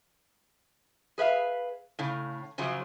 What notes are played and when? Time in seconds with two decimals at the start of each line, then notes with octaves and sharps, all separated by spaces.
1.18 G#4 B4 E5 F5
1.99 A2 C#3
2.58 F#2 C#3 F3 F#3 F4